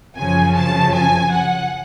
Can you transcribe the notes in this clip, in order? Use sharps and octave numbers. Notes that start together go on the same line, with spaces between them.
F#2 C#3 F3 G#5
A5
G#5
F#5